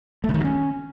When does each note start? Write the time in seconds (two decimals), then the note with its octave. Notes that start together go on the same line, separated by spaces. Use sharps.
0.24 A3
0.29 C#3
0.34 D#3
0.39 F#3
0.45 C#4